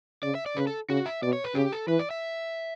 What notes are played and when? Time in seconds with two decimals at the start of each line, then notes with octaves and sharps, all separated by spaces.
0.23 C#3 D5
0.35 E5
0.46 D5
0.57 C#3 B4
0.67 A4
0.89 C#3 F#4
1.06 E5
1.22 B2 D5
1.33 C#5
1.44 B4
1.55 C#3 G4
1.72 A4
1.88 E3 B4
1.99 D5
2.11 E5